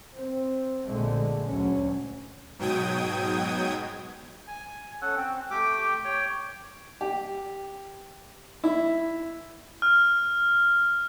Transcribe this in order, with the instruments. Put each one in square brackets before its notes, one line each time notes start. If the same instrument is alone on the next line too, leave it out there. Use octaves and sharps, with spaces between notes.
[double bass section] C4
A#1 B2 D3 G#3 A3
D2 F#3 C#4
[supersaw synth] G#2 B2 F#3 G5 D#6 G#6
[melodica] G#5
C#4 A4 F#5
C4
A3 G4 G5 D6
C#5 G5
[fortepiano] G4
E4
[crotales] F6